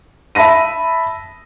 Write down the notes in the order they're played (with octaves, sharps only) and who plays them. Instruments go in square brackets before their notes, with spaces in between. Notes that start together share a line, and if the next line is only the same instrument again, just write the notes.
[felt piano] E5 A5 B5 A#6 D#7